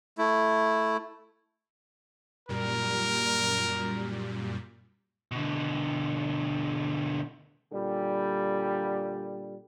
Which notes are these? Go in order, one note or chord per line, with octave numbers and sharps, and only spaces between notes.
A3 E4
F#2 A#2 G3 A#4
B2 D3
A#2 D3 G3